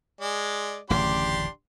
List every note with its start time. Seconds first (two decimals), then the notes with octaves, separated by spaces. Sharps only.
0.21 G#3 D5
0.90 D1 A1 C#3 D4 G4 C6